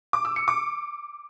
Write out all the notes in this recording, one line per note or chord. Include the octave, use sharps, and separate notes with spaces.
D6
E6
C#7
D6